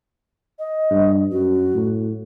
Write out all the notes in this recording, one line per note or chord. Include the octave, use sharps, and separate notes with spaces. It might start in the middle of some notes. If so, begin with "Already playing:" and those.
D#5
G2
F#2 F#4
A2